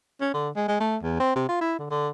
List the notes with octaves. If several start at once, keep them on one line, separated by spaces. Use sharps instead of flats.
C#4
D3
G#3
G#3
A3
E2
C4
C3
F4
E4
D3
D3